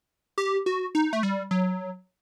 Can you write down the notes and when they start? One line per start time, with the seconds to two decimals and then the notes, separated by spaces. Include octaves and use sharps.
0.38 G4
0.66 F#4
0.95 D#4
1.13 A3
1.23 G3
1.51 F#3